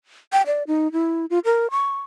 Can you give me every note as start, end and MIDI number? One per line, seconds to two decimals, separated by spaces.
0.33 0.42 79
0.47 0.63 74
0.67 0.91 63
0.92 1.26 64
1.30 1.39 65
1.45 1.67 70
1.71 2.02 85